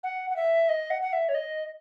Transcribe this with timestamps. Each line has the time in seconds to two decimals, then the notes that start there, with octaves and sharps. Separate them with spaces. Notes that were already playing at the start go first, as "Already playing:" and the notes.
0.03 F#5
0.30 F#5
0.36 E5
0.69 D#5
0.90 F#5
1.02 F#5
1.13 E5
1.29 C#5
1.35 D#5